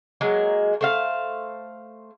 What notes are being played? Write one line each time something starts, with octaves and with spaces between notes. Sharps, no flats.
F#3 G#3 A#3
A3 C5 F5